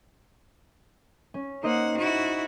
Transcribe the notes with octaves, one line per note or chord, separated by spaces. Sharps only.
C#4
A#3 D#4 C5 D#5 F#5
E4 F#4